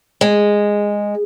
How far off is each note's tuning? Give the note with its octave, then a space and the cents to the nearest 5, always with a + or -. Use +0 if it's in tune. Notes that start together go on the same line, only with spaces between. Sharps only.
G#3 -10